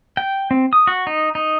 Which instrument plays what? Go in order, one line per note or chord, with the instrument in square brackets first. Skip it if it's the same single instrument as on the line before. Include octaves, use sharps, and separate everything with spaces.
[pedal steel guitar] G5
C4
D#6
F#4
D#4
D#4